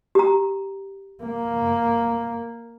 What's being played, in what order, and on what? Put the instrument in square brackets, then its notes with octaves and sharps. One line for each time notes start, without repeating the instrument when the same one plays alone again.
[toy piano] G4 A#5
[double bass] A#3